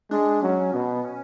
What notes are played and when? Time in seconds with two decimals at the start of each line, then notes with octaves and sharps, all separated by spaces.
0.11 G#3 D4
0.42 F#3 C#4
0.73 B2 B3
1.05 C#4